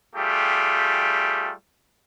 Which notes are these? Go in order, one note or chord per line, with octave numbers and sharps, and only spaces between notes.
G3 A3 F4 G4 G#4